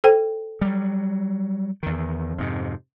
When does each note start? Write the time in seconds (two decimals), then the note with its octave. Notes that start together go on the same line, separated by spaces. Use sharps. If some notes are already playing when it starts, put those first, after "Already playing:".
0.04 A4 C5 G5
0.61 F#3 G3
1.83 E2 D#3
2.38 F2 G#2 C3